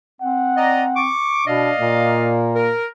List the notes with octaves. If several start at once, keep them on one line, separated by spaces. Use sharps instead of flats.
C4 F#5
D5 D#5 A#5
C#6 D6
B2 D4 D5 D#5 F5
A#2 A#3
A#4